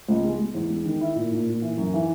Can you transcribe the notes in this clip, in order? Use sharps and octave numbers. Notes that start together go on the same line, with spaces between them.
C#2
G#3
G#3
E2
G#3
D#3
E4
A#2
A#2
A#2
E3
F#2
E3